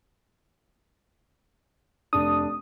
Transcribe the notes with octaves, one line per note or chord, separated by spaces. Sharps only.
F1 D4 D#6